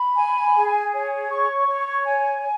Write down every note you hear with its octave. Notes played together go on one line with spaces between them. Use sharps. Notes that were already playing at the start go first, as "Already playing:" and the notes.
Already playing: B5
G#5
G#4
C#5
C#6
C#5
G#5